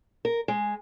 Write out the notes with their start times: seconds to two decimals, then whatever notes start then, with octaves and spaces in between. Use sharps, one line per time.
0.25 A#4
0.48 G#3